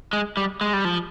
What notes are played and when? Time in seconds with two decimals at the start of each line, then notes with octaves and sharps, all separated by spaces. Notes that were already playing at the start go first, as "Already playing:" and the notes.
0.13 G#3
0.37 G3
0.61 G#3
0.73 G3
0.85 F3